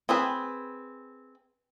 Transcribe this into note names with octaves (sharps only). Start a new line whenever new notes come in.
C4 G#4 B4